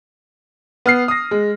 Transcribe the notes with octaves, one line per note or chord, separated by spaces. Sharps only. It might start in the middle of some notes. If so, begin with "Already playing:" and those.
B3 F6 C7
D#6 A#6
G#3